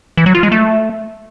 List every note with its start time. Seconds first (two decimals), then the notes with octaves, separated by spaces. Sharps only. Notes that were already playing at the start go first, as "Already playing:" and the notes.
0.17 E3
0.26 F#3
0.35 F4
0.43 G#3
0.52 A3